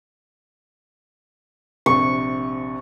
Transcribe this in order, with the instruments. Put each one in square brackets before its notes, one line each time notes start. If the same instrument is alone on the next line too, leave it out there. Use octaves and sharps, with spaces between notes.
[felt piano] A#1 C3 [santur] C#6